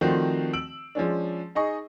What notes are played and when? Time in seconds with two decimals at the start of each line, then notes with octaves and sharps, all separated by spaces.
0.01 D#3 F3 A3 C4 D4 F#4
0.53 E6 D7 F#7
0.95 F3 G#3 C#4 D4
1.55 D#4 G#4 D#5 C#6